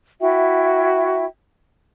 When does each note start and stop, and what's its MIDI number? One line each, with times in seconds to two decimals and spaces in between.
0.20 1.25 64
0.20 1.25 66
0.20 1.25 76
0.20 1.25 79